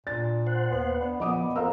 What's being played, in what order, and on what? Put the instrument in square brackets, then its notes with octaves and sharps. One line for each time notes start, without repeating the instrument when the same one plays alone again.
[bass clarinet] A#2 [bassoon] D4 [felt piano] A6
[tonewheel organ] C5 F#5
[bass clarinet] D#2 [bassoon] B3
[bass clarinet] B3 [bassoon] D4
[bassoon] A#2 [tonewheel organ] F3 [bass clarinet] B3 [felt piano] D#5 D6 D#6
[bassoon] F3 [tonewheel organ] C4 [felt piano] A4 F5 E6 [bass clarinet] A#4